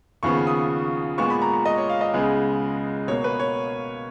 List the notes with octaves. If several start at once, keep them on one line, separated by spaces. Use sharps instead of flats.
D#2 C#3 F3 B3 C#6
D#6
A#2 G#3 B3 C#6
B5
A#5
A#5
D#5
C#5
F5
D#5
C#2 C#3 G#3 B3
B2 A#3 C#5
B4
C#5